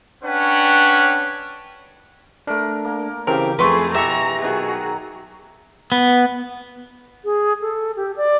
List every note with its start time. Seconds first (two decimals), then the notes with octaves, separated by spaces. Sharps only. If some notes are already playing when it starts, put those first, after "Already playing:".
0.24 C#4 D4 B4 C#5 F#5 G5
2.47 A3 D4 A#4
2.85 A#3
3.27 C#3 E3 C4 G4 A#4
3.59 F2 F#3 A3 G#4 B4 C6 C#6
3.95 B2 E3 G4 E5 A#5 C#6
4.42 B2 D#3 F#3 F#4 G#4
5.92 B3
7.25 G#4
7.61 A4
7.96 G4
8.17 D5